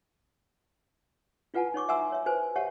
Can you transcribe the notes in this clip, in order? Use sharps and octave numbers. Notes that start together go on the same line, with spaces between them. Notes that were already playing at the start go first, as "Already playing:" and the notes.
E4 F4 B4 F#5 G#5 A5
D#4 C#5 C#6 D6
E5 F#5 G#5 A#5 C6 E6
C#5 E5
F#4 B4 C5 G#5
G4 C#5 E5 F#5 A5